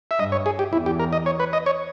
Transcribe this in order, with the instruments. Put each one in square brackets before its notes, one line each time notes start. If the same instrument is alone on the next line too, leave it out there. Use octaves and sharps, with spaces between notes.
[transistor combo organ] E5
[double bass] G2 [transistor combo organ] D#5
[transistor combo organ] C#5
G#4
G4
[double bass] E2 [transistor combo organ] E4
[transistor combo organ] G4
A#4
D#5
C#5
B4
D#5
C#5